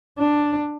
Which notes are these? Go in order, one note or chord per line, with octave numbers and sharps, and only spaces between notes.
D4